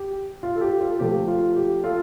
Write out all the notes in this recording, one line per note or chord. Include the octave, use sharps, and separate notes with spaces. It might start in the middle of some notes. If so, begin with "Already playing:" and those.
Already playing: G4
F4
A4
G4
F4 A4
C3 F3 A3 G4
F4
G4
F4 A4